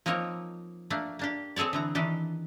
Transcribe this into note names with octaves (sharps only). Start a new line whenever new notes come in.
F3 A#3 C4 D#4 A#4 C#5
A3 A#3 D4
A#3 D4 G4
C4 G#4 A4 C#5 D5
D3 E3 A#5
D#3 E3 D4 G4